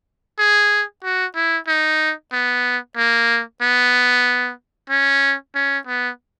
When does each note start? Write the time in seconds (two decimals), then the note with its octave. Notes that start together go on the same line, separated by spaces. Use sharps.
0.38 G#4
1.03 F#4
1.35 E4
1.67 D#4
2.32 B3
2.97 A#3
3.62 B3
4.90 C#4
5.55 C#4
5.87 B3